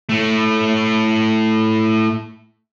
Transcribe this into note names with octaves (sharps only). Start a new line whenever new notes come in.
A2 A3